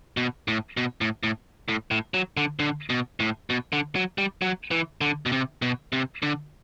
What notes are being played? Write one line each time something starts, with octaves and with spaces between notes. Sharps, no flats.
B2
A2
B2
A2
A2
A2
A2
F#3
D3
D3
B2
A2
B2
D3
F#3
G3
F#3
E3
D3
B2
C3
B2
C3
D3